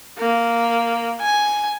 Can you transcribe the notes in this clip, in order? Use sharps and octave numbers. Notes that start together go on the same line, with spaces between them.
A#3
G#5